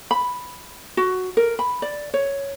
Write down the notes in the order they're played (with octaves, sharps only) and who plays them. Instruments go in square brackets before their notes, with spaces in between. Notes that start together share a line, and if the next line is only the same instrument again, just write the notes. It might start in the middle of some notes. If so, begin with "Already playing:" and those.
[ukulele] B5
F#4
A#4
B5
D5
C#5